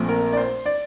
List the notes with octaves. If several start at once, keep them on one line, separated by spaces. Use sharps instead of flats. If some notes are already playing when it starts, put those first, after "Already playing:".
Already playing: A#1 A#2 A3 C4
A#4
D5
C5
D5